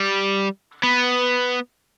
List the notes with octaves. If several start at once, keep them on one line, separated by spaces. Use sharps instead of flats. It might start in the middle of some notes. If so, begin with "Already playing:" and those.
Already playing: G3
B3